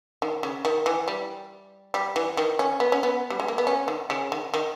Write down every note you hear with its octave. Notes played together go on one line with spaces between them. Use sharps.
D#3
C#3
D#3
E3
G3
G3
E3
D#3
C#4
B3
C#4
B3
G3
G#3
A#3
B3
C#4
D#3
C#3
D#3
D#3